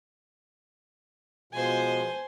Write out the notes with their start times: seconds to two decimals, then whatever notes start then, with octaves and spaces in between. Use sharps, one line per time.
1.53 B2 F3 G#3 C5 G#5